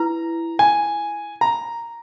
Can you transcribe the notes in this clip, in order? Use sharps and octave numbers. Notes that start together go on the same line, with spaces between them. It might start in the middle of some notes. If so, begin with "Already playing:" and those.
Already playing: E4 B4 A#5
G#5
A#5